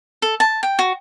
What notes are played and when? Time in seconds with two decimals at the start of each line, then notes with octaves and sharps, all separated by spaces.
0.22 A4
0.40 A5
0.63 G5
0.79 F#4